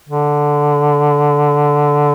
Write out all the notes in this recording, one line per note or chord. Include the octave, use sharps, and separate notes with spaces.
D3